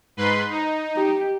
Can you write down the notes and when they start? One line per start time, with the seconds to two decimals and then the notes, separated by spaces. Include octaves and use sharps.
0.17 G#2 B4 C6
0.50 D#4
0.96 G4